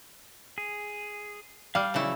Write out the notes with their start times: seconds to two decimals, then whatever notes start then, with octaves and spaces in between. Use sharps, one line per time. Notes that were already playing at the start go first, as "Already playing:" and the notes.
0.58 G#4
1.75 G3 F5 F6
1.94 C#3 E3 F#3 E4 C#6